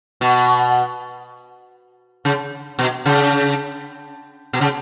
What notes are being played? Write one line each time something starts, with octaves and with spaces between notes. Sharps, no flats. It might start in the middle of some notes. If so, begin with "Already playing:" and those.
B2
C#3
B2
C#3
B2
C#3